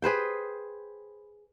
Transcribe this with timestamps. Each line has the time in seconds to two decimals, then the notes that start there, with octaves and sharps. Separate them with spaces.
0.02 G#4 B4 C5 G5